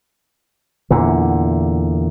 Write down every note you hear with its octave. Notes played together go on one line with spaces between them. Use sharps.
E2 A#2 D3